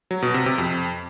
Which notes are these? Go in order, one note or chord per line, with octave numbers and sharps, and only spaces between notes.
F#3
B2
C3
C3
F2